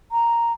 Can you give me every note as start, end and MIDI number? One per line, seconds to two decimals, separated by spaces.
0.12 0.52 82